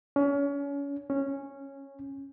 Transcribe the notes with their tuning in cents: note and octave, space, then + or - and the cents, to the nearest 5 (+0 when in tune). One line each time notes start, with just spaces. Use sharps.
C#4 +30
C#4 -10